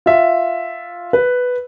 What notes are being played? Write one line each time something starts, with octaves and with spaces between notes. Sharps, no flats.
F4 E5
B4